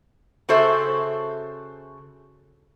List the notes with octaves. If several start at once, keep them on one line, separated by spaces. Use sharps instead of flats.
C#3 F#4 A4 C5 E5